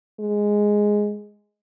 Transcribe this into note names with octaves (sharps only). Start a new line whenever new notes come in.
G#3